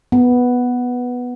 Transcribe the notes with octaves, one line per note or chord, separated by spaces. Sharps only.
B3